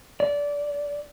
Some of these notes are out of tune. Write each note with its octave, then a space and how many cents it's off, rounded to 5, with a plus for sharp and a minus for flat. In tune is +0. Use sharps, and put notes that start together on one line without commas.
D5 -20